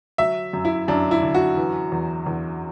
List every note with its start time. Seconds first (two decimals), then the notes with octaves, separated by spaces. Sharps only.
0.18 F#3 E5
0.53 F#2
0.65 E4
0.88 F#2 D4
1.11 E4
1.22 D3
1.35 F#4
1.57 E3
1.92 E2
2.26 E2